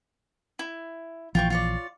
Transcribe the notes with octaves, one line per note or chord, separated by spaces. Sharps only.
E4
A#1 E3 F3 F4 G5 C#6
F4 C#5 D5